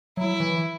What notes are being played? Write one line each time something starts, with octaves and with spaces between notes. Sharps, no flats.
F#3 E4
E3